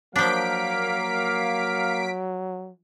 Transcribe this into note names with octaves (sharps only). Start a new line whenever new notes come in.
F3 F#3 A#3 D4 F5 B6 D7